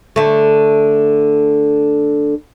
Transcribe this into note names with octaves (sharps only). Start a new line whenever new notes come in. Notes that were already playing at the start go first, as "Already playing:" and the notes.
D3 A3